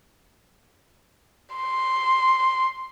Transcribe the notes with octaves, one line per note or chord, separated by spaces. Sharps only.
C6